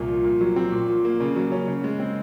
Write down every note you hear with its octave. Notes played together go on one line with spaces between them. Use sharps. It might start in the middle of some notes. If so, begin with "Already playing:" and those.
Already playing: C2 A#2
F3
A#2
F#3
C4
A#2
F3
A#3
C#3
F#3
C#4
C#3
G#3
C4